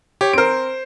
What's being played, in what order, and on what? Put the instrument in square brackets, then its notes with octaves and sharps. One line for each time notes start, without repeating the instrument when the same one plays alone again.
[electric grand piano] G4 [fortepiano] C#5
[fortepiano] C4 A#4 [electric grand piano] C5 D7